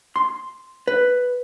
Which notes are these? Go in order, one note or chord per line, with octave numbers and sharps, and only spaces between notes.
C6
B4